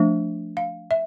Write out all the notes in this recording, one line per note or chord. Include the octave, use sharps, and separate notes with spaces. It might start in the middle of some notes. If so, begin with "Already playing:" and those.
Already playing: F3 A3 D4 E5
F5
E5